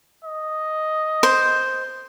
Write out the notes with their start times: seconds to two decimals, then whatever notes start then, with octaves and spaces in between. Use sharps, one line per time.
0.24 D#5
1.23 C5